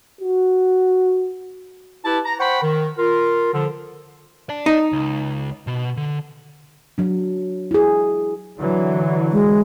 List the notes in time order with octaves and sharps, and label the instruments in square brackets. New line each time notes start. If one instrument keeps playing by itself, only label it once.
[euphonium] F#4
[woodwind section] E4 G4 B4 A5
A#5
C5 F#5 G5 B5 C#6
D#3
F4 A#4
D3 F3
[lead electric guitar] D5 A5
[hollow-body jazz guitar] D#4
[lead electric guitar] C#2
B2
D3
[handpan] F#3 D4
E4 G#4
[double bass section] D3 E3 F#3
[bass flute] G#3